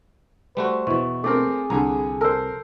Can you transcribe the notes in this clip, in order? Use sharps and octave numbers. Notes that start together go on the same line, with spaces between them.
G3 A3 F#4 C5
E2 B2 E4 C#6
A3 C4 G#4 A#4 D6
C2 D3 G#5 A#5
A4 A#4 C5 A5 E6